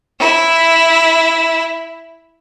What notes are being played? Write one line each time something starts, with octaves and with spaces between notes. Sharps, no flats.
E4 E5